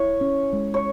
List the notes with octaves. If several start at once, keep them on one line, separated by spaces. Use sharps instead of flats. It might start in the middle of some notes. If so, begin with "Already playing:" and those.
Already playing: E4 C#5
C#4
G#3
C#5